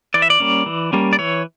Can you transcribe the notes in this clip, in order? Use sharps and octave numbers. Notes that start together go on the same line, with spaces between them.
E3 D5
E5
D5
G3 A#3 C#4
E3
G3 A#3 C#4
D5
E3 C#5